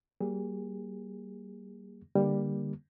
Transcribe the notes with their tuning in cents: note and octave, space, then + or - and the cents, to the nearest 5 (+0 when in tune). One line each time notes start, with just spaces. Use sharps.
G3 -30 A#3 +0 G#4 -30
D3 +0 G3 +10 A#3 +10